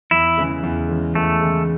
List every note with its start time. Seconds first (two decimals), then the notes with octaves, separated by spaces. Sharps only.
0.11 E2 E4
0.37 C#3 E3 G#3
0.63 E2
0.89 C#3 E3 G#3
1.15 E2 A3
1.41 C#3 E3 G#3